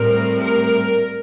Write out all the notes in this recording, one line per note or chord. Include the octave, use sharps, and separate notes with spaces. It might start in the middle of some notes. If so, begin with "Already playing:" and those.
Already playing: A2 G3 C4 A#4
A#4